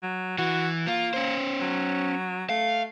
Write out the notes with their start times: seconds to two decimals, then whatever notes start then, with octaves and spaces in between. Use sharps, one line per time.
0.03 F#3
0.38 E3 F#4
0.87 A#3 F4
1.14 C#4 C5
1.61 F#3
2.49 A3 F5